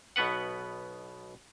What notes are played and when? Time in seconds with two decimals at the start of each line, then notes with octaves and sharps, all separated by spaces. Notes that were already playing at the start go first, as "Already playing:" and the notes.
0.16 B1 B2 B3 B4 F#5